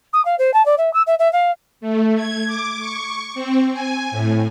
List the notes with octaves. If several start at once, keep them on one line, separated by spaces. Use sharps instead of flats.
D#6
F5
C5
A5
D5
E5
E6
E5
E5
F5
A3
G#6
D6
C#6
C4
G#5
A2